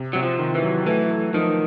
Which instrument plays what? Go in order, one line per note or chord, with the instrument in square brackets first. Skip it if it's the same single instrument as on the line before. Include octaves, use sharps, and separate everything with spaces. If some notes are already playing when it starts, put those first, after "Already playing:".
Already playing: [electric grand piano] C3
[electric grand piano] C3 [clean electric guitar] F#3
[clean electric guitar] F3
[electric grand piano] D#3
[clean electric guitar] E3
[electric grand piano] F#3
[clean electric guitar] E3 [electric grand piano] A3
[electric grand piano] A3
[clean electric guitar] D#3 [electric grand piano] F3